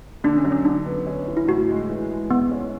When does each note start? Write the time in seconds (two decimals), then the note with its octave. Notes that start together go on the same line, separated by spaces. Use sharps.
0.24 D3 D4
0.38 C#4
0.45 F#3
0.52 C#4
0.65 D3 D4
0.86 B3
1.07 C#4
1.28 E3
1.37 E4
1.48 A2 F#4
1.69 G#3
1.90 E3
2.10 G#3
2.30 E3 B3
2.51 C#4